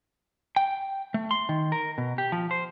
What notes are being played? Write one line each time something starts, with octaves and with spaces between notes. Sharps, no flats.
G5
A3
C6
D#3
A#4
B2
G4
F3
C5